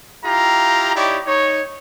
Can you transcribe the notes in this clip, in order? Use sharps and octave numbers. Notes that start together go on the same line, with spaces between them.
E4 F4 G4 A#5
D#4 E4 G4 C#5 D5
D#4 C#5